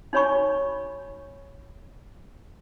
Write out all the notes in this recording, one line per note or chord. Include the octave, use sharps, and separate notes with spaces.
D#4 F#4 C#5 G#5 B5 C#6